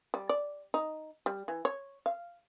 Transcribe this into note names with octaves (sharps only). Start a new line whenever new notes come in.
G3
D5
D#4
G3
E3
C#5
F5